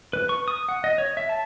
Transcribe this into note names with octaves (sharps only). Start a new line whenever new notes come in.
B4
C#6
D#6
F#5
D#5
C#5
E5
A5